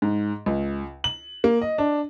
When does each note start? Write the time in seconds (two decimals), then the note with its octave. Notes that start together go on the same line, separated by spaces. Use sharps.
0.02 G#2
0.46 C#2
1.04 F#7
1.44 A#3
1.62 D#5
1.78 D4